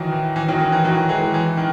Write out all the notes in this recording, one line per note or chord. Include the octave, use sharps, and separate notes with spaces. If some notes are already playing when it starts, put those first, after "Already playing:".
Already playing: D#3 E3 F#3
E3
E3
D#3 F#3
D#3
E3
D#3 F#3
E3 G#3
E3
D#3